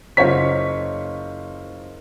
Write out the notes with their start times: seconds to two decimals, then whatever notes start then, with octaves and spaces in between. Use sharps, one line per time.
0.17 F#1 F4 C5 C#5 B6